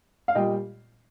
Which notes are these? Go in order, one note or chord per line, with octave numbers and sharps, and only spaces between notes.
F5
A#2 G3 D#5 G5